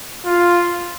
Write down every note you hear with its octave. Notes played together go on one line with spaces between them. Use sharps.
F4